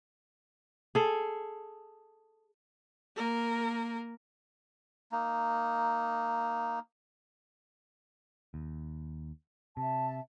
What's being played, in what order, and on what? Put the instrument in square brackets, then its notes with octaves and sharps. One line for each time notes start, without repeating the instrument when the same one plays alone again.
[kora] G#4 A4
[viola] A#3 A#4
[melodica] A#3 D#4
[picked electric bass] D#2
[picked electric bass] C3 [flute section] E5 A5